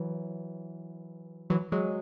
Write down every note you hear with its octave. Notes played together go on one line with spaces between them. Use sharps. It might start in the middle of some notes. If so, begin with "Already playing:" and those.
Already playing: E3 F#3
E3 F#3
F#3 G#3